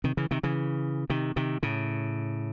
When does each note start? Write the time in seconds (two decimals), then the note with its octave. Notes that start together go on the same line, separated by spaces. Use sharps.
0.04 C3 D#3
0.17 C#3 E3
0.31 C3 D#3
0.43 C#3 E3
1.10 C3 D#3
1.36 C3 D#3
1.63 A2 C#3